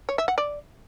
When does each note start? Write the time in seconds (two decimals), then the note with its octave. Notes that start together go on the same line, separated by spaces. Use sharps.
0.09 C#5
0.18 E5
0.28 F#5
0.38 D5